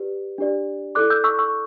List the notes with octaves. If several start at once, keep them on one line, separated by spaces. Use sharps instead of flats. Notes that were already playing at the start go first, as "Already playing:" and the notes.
Already playing: G4 B4 D5
D4 G4 D5
E4 A4 D5 D6 F#6
E6 G6
C#6 E6
C#6 E6